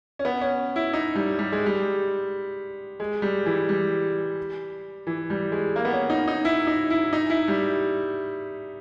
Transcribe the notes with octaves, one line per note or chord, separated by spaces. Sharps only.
C#4
B3
C#4
E4
D#4
G3
G3
G#3
G3
G#3
G3
E3
G3
E3
G3
G#3
A#3
B3
C#4
D#4
D#4
E4
D#4
E4
D#4
E4
G3